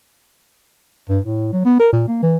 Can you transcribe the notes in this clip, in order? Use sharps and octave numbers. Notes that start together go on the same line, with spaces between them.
G2
A2
F#3
B3
A#4
A#2
A#3
E3